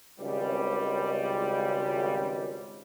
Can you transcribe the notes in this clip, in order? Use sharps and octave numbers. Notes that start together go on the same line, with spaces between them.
G#1 C#2 G3